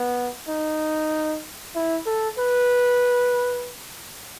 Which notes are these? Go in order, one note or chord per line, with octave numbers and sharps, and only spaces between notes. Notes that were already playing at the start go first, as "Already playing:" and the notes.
Already playing: B3
D#4
E4
A4
B4